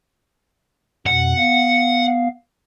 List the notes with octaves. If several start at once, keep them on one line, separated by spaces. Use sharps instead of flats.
F2 B2 F#5
B3 F5